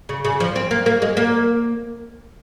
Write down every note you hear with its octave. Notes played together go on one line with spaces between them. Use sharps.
C#3
C#3
F3
C4
A#3
A#3
G#3
A#3